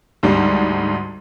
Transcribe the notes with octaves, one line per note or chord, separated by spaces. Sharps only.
D2 G#2 G3